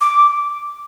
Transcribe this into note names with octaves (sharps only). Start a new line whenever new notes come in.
D6